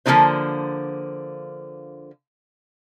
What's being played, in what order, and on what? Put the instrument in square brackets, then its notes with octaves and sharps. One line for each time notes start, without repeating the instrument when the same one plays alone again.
[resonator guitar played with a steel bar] D3 F3 F#3 A#3 D#4 C5